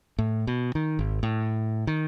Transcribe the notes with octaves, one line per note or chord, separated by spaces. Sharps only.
A2
B2
D#3
G#1
A2
D#3